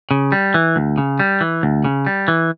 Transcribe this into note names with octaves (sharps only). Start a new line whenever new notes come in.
C#3
G3
E3
D2
C#3
G3
E3
D2
C#3
G3
E3